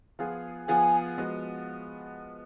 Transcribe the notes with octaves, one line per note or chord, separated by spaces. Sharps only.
F3 B3 F4 G#4
F3 B3 F4 G#4 G#5
F3 G#3 B3 F#4